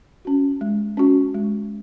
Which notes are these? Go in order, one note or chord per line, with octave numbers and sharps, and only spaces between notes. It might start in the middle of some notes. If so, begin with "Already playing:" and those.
C#4 F#4
G#3
C#4 F#4
G#3